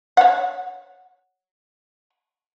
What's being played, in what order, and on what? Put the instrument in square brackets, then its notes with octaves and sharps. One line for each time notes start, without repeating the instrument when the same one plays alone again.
[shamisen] C#5 F#5